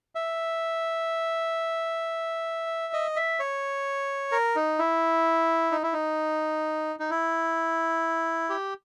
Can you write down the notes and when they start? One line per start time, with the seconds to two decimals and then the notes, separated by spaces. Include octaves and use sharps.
0.15 E5
2.93 D#5
3.16 E5
3.40 C#5
4.32 A#4
4.56 D#4
4.79 E4
5.72 D#4
5.83 E4
5.93 D#4
6.99 D#4
7.10 E4
8.49 G4